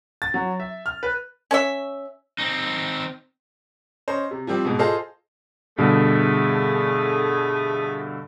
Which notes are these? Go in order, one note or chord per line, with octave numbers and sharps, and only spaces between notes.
A6
F#3
E5
F6
B4
C#4 C#5 E5
C4 D#4
C#4 C5 D#5
C3
F3 G3 C4 G4
G#2 B2
F4 G#4 A4 C5 D#5 F5
G2 B2 D3 A3 G#4